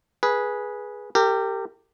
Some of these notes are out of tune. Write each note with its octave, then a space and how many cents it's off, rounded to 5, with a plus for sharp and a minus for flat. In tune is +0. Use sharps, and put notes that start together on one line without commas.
G#4 +0 B4 -15
G4 +0 A#4 -35